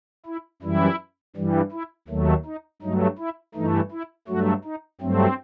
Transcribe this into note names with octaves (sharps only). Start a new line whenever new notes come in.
E4
F#2 E3 G3 E4
G2 E3 G3
E4
D#2 D#3 F#3 A3
D#4
G2 F#3 A3 D#4
E4
G2 E3 A3 D#4
E4
G2 F#3 A3 F#4
D#4
G2 F#3 A3 C4